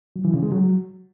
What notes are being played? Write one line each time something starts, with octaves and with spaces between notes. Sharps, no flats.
F#3
E3
C#3
G#3
F#3